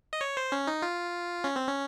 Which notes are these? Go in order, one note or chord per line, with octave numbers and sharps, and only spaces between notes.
D#5
C#5
C5
C#4
D#4
F4
C#4
C4
C#4